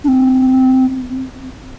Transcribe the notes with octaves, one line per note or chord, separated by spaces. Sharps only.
D4
C4